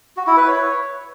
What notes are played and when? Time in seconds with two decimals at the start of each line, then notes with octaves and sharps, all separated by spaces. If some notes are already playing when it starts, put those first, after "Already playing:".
0.17 F#4
0.27 E4
0.37 B4
0.47 C#5